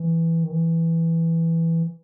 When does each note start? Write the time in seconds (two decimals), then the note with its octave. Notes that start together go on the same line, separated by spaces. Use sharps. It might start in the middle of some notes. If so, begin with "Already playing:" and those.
Already playing: E3
0.44 D#3
0.52 E3